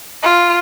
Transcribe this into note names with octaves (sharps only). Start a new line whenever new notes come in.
F4